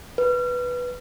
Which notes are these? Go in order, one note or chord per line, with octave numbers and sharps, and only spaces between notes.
B4